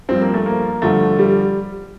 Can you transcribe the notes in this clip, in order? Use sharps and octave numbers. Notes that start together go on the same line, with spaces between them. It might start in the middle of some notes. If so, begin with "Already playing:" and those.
G2 F3 C4
A#3
A3
A#3
G2 D3 F3 A3
G3